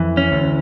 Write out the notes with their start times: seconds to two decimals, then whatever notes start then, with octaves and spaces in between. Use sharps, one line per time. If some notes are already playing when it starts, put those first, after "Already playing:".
Already playing: F2 E3
0.17 C#4
0.32 D2